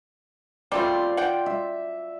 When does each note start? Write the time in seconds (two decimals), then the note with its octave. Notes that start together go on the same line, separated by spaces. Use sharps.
0.72 G3 A3 C4 F4 D5
1.17 F#5 G5
1.46 E5